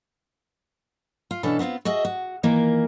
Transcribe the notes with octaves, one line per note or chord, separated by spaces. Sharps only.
F4
B2 E3 C#4 D4 A4
B3 C4 D#4 F4
F#4 G#4 D#5 E5
F#4
D#3 E3 A#3 F4 A#4